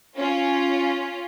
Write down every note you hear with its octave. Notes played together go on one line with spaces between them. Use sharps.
C#4 F4